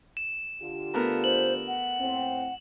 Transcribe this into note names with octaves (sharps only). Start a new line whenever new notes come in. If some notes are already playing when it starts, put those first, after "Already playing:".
E7
D3 F4 G4
A3 B3 A#4
C5 F#7
F#5
A2 C4